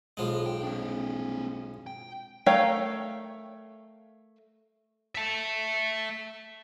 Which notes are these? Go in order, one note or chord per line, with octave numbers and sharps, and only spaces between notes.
B1 F3 G#3
G5
C4 D4
G5
A3 A#4 C#5 F5 G5
E5 A5